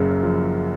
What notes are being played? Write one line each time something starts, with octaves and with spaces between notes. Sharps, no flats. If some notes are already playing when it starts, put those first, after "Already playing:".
Already playing: F#1 F#2 C#3
F3